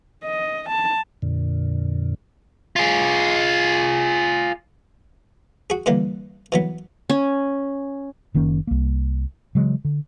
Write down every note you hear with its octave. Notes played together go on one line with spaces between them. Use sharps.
D#5
A5
F2 A#2 D3
F4 G#4
F#4 G#4
D3 E3 G3 A#3
E3 F#3 B3
C#4
F#1 D#3 A#3 C#4
C2 A#3
C#3 E3 F#3 G#3
D3